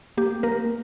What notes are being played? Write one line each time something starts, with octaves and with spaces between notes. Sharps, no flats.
A#3 G4
A#3 A#4